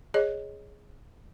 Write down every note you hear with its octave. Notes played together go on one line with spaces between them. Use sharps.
G#4 C#5 D#5